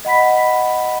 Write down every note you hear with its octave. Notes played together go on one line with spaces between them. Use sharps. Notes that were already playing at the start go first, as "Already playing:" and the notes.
D#5 F#5 B5 B6